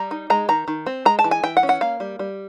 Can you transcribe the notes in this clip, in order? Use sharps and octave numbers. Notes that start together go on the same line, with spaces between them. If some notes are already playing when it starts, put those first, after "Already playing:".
Already playing: G3 A#5
D#4
G#3 A#5
D#3 A#5
D#3
C4
G#3 A#5
A5
E3
G#5
E3 G5
F#5
C#4
F#5
A#3 F5
G3
G3